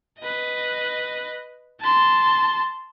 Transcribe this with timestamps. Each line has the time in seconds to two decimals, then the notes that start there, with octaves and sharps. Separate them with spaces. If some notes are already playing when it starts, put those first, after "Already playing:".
0.19 B4 D#5
1.81 A5 C6